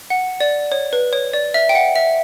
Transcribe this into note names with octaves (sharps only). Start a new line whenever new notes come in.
F#5
D5
C#5
B4
C#5
D5
E5
G5
F#5
E5